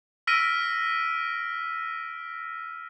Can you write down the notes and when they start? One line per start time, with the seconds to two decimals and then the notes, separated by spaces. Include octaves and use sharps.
0.27 E6 F6 A#6 B6 D7 D#7